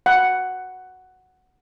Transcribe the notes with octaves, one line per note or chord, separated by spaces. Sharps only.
F#5